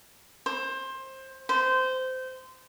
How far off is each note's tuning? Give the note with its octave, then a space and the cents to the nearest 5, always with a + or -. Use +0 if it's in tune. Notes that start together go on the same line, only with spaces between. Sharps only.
C5 +20
C5 -20